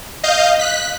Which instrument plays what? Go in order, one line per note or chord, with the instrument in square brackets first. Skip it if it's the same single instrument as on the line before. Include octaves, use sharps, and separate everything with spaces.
[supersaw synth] D#5 F5 G6
F#6 B6